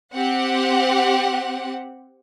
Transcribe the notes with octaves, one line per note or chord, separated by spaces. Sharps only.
C4 G4 F#5